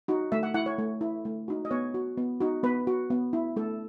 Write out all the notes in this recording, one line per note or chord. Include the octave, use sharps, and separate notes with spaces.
D#4 F#4
A3 E5
F#5
E4 F#5
C#5
A3
E4
A3
D#4 F#4
D#5
B3 C#5
F#4
B3
D#4 F#4
B3 B4
F#4
B3
E4
A3 A4